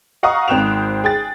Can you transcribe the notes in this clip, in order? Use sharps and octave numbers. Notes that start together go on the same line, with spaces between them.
D#5 F5 F#5 A#5 C#6 D#6
G#1 C4 G5 F#6 E7 F7
G#4 G5 A6